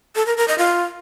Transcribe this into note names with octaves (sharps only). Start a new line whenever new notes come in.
A4
A#4
A#4
D#5
F4